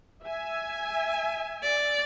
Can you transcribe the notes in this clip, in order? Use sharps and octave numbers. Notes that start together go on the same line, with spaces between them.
E5 G#5
D5